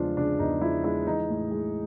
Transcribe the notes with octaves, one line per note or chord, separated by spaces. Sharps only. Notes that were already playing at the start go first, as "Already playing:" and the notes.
Already playing: E2 C#3 F3 G#3 D4 F4
C#3 D4
E2 D#4
F3 E4
G#3 E4
E3 D#4
A2
G#3